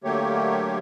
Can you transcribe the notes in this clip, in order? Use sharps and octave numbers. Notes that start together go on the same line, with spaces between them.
D3 F#3 A3 A#3 G4 C#5